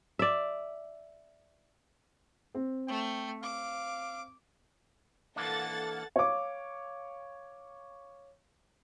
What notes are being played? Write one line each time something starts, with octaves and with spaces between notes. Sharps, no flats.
D5 E5
C4
A3 G5
F5 D6
E3 A#3 D4 A4 F#5 A6
C#5 F5 D6